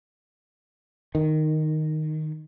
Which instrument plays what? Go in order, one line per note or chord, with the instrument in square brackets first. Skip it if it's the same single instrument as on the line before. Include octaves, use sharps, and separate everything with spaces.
[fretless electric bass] D#3